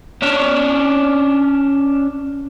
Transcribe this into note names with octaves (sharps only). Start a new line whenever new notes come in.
C#4 D4